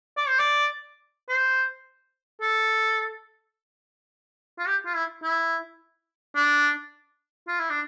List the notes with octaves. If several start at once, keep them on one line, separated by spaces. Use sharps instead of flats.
D5
C5
D5
C5
A4
F4
G4
F4
E4
E4
D4
F4
E4
D4